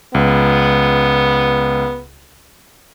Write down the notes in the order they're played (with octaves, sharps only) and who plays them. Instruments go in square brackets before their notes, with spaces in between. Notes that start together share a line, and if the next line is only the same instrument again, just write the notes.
[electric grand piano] C#2 [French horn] B3